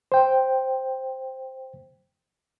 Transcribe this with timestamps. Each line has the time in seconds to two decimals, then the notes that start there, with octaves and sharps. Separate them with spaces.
0.12 C5 G5